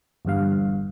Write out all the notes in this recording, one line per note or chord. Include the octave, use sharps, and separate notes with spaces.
G1 E2 G2 F5